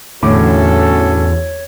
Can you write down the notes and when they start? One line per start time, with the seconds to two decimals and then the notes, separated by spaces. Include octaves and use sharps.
0.23 E2 A2 D3 C#4 F#4 A4 C#5 D6